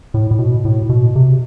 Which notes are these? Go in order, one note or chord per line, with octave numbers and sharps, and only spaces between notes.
A2
A2
B2
A2
B2
C3